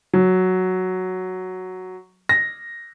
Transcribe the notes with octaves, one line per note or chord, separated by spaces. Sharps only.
F#3
A#6